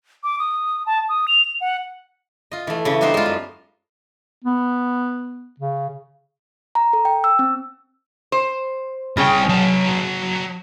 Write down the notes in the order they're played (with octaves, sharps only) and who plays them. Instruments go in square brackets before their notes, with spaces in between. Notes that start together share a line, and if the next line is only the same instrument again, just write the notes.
[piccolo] D6
D#6
A5
D#6
F7
F#5
[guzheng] F4 D#5
E3 A3
C#3 E3
G3 B3 D4 D#4 C5
G#3 F4
F#2
[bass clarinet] B3
C#3
[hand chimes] A#5
A4
G5
E6
C4
[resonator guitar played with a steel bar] C5
[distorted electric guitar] C2 G5 [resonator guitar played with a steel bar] C#3 G#4 C#5
[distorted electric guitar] F#3 A5